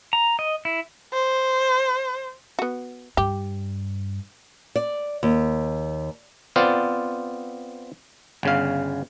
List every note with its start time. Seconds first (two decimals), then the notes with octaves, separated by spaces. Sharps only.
0.13 A#5
0.39 D#5
0.65 E4
1.13 C5
2.59 B3 F#4
3.17 G2 G4
4.76 D5
5.23 D#2
6.56 B3 C4 F4 C5 D5
8.43 G1 C#3 F5